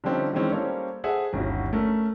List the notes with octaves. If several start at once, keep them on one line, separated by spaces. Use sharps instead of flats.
D3 F3 G3 C4 C#4 D#4
D#3 E3 G#3 C4 C#4 D#4
G3 A#3 C#4 A4 C5 C#5
G#4 A4 C5 E5 F#5
G1 D#2 C#4 E4 F#4
A3 C#4 A#4